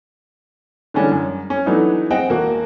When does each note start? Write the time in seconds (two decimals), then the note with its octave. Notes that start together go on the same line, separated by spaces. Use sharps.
0.94 D3 E3 G3 G#3 C#4 D4
1.11 F#2
1.50 C#4
1.66 E3 F#3 A3 B3 D4 D#4
2.11 C4 G#4 D#5 F#5 G5
2.29 E1 A#3 F#4